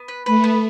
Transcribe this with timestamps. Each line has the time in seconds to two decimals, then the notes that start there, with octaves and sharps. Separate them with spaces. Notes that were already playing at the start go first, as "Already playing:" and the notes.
Already playing: B3
0.08 B4
0.26 A3 B4
0.44 B3